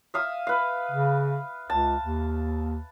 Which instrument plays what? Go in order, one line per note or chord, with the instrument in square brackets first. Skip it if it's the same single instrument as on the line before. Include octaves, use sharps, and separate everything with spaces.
[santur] E5 F5 D#6
B4 F5
[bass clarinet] C#3
[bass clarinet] C#2 [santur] A5
[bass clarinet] D#2